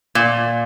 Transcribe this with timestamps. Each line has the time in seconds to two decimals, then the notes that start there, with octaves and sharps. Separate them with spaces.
0.15 A#2